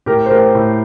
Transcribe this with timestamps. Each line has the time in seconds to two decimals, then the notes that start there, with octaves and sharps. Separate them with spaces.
0.06 A2 G4 A#4
0.26 C5
0.30 A3 G4 A#4
0.55 A2